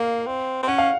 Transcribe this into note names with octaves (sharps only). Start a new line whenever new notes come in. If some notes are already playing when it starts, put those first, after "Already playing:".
Already playing: A#3 F5
C4
C4
C#4 F#5
F5